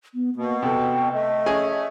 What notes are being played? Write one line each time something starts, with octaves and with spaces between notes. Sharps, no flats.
B3
B2 A#3
C3 A4 G5
A3 D#5
C#4 G#4 G#5